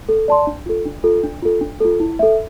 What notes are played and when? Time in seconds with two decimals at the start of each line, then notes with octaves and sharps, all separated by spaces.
0.09 A4
0.28 D5 A5 C6
0.47 D4
0.66 F4 A4
0.86 D4
1.04 F4 A4
1.23 D4
1.42 F4 A4
1.61 D4
1.80 F4 A4
2.00 E4
2.19 A4 E5